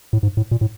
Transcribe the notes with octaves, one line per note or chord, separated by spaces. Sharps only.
A2
G#2
A2
A#2
A2